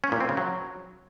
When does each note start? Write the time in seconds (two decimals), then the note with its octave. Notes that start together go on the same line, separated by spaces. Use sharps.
0.04 C#4
0.12 A#2
0.20 C4
0.29 C#3
0.37 F#3